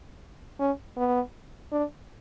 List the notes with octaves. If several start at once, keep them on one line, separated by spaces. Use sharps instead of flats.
C#4
B3
D4